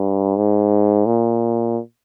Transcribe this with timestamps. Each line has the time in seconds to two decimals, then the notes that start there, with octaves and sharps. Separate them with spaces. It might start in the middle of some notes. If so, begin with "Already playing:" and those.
Already playing: G2
0.36 G#2
1.06 A#2